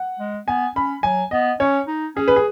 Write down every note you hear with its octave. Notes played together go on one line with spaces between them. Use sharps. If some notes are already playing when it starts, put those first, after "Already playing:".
Already playing: F#5
G#3
B3 G#5
C#4 B5
F#3 G#5
B3 D#5
C#4 C#5
D#4
C#4 G#4
B4
G#4